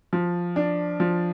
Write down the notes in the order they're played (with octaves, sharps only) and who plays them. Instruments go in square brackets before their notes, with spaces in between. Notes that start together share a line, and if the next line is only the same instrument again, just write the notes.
[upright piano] F3
D4
F3